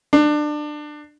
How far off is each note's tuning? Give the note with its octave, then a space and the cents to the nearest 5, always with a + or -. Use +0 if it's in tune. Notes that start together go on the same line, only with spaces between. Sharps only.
D4 +25